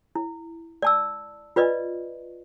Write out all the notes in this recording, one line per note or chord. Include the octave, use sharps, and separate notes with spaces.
E4
D5 A5 E6
F4 B4 D5 D#5